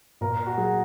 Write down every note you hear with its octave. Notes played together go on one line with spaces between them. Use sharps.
A#2 A#4
F#4
F#3 G#4